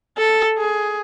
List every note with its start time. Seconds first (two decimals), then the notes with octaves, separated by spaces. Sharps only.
0.17 A4
0.58 G#4